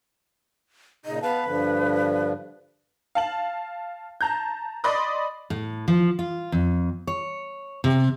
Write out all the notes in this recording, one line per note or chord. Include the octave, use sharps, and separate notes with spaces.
A#2 C#3 D#4 D#5
B3 B4 F5 A5
G2 D3 F3
F5 A5 F#7
A5 A#5 G6
D5 D#5 B5 C6 D6 D#6
A2
F3
F4
F2
C#5
C3